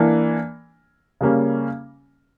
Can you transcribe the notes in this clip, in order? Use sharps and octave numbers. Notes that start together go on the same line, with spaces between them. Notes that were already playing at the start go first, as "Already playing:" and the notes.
Already playing: E3 A#3 D4
C#3 G3 A#3 C#4